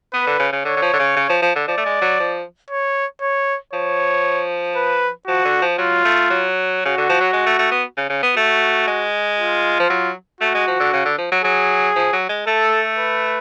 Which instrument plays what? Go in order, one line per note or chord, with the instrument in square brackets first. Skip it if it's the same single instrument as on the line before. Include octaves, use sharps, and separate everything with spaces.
[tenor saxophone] B3 [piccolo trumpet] B4
[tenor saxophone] D3
C#3
C#3
[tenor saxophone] D3 [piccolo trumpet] C#5
[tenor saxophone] D3
F3
D3
C#3
C#3
F3
F3
D3
[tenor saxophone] F3 [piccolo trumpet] D5
[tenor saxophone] A3
G#3
F#3
F3
[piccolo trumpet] C#5
C#5
[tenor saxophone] F3 [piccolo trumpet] C#5
[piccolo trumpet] B4
[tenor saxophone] F3 [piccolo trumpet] F#4
[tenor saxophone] D3
F3
[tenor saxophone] F#3 [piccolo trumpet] F4
[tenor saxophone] A3
F#3
[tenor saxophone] C#3 [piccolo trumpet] F#4
[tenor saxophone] D3
F3
F#3
G#3
A3
A3
B3
C#3
C#3
B3
[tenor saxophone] A3 [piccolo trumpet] F#4
[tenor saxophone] G#3
[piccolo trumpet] F4
[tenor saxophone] F3
F#3
[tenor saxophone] A3 [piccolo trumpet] F#4
[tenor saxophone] G#3
F3
D3
C#3
D3
F3
F#3
[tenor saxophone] F#3 [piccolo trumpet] G#4
[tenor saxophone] F3
F#3
G#3
[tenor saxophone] A3 [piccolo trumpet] A4
[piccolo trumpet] B4